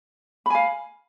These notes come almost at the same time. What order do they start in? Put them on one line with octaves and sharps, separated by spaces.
B5 G#5 F5